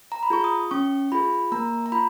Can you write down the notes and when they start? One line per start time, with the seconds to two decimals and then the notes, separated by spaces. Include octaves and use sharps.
0.12 A#5
0.23 B5
0.30 F4 G#4 C#6
0.44 D#6
0.71 C#4 C#6
1.12 F4 G#4 B5
1.52 A#3 A#5
1.86 A#5
1.92 F4 B5